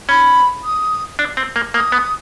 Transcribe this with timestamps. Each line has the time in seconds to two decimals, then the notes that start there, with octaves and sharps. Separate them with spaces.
0.08 C#4 B5
0.64 D#6
1.19 D4
1.37 C4
1.56 A#3
1.74 A#3 D#6
1.92 B3